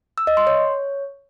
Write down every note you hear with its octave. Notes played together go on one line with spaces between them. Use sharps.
E6
D#5
C6
C#5